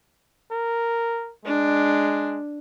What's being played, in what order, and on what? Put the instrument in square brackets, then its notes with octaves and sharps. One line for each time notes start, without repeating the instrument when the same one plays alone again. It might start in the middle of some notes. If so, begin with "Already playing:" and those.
[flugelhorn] A#4
[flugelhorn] G#3 [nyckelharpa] D4